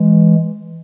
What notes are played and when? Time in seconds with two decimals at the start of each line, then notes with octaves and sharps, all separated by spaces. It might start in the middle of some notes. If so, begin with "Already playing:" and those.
Already playing: E3 G#3